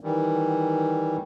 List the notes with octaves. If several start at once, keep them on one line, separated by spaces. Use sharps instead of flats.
D#3 E3 G3